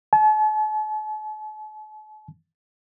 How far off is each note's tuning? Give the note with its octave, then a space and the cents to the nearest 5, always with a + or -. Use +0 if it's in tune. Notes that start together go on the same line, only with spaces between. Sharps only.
A5 -45